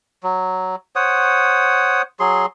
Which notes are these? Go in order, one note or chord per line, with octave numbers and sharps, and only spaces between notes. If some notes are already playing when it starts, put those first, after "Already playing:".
F#3
C5 C#5 F#5 D#6
F#3 G#4 C6